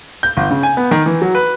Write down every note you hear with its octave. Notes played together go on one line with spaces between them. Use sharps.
G6
G1
C#3
G#5
B3
D#3
E3
F#3
B4